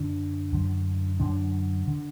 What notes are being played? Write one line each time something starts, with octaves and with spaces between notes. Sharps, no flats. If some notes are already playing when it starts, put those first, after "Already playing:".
Already playing: F#2 D3 D4
F#2 D3
F#2 D3 D4
D3